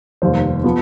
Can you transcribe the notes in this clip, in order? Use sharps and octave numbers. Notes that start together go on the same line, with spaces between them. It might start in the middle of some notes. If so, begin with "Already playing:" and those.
F1 D#2 D#3 G3 C5
F3 B3